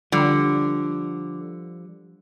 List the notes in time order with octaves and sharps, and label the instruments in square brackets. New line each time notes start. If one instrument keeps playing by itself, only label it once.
[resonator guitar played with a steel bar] D3 [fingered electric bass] F3 [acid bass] G3